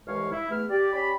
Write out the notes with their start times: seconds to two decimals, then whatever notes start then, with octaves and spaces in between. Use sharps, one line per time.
0.06 C2 G2 E3 G#3 C#5 F5
0.31 E4
0.50 E2 A3 F6
0.69 G4 D5
0.93 C#4 G4 D5 B5